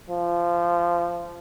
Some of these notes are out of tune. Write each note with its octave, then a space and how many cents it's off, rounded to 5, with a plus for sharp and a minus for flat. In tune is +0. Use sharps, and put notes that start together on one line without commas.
F3 -15